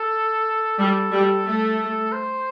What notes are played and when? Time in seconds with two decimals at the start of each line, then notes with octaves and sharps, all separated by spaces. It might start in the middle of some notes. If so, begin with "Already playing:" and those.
Already playing: A4
0.79 G3 A4
1.11 G3
1.45 A3
2.12 C5